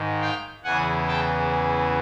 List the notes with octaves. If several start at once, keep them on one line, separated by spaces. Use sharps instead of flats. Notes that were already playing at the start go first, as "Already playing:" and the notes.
Already playing: G#2 D#3
F5 G5
E2 C#3 E3 F#5 G#5
G5 A5